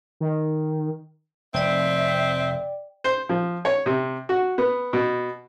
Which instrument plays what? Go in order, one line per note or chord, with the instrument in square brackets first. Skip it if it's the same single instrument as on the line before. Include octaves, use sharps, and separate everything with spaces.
[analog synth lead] D#3
[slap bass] F1 [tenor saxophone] C4 [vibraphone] D5 G5 [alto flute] E5
[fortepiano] C5
F3
C#5
C3
F#4
B3
B2